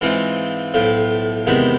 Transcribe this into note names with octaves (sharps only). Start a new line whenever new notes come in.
G#2 E3 G#3 C4 F4
B1 A2 F3
E2 C3 D#3 G#3 B3